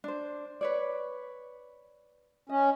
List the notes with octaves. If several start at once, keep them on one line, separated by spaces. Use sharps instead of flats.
D4 C5
B4 C#5 D5
C#4 D#5